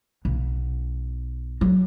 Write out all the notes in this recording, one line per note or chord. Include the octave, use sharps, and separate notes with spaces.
B1
F#3